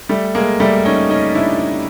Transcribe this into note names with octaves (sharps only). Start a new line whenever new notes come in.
G3 A3
G#3 A#3
G3 A3
C#4 D#4
C#4 D#4
D4 E4